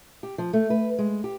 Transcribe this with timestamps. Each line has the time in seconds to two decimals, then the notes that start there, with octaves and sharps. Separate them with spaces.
0.23 G4
0.38 F3
0.53 A3
0.70 B4
0.99 G#3
1.24 G4